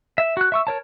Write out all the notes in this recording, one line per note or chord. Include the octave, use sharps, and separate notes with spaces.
E5
F#4 F#6
E5 C#6 E6
A#4 C#5 A5